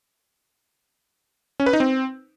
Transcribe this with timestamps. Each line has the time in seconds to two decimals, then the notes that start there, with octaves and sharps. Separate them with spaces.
1.60 C#4
1.66 B4
1.73 D#4
1.80 C4